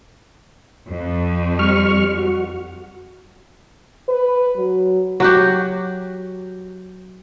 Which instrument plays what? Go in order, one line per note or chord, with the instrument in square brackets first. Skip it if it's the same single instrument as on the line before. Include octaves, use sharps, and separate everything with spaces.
[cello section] F2
[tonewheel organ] G3 C#6 F6
F#4
[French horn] B4
F#3
[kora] F#3 F#4 G4